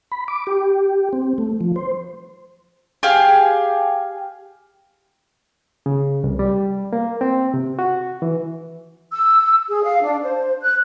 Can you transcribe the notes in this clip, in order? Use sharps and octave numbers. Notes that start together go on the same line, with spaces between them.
B5
D6
G4
C4
A3
F3
C5
G4 G#4 F5
C#3
C2
G3
A#3
C4
C3
F#4
E3
E6
G#4
F5
D4
C5
F#6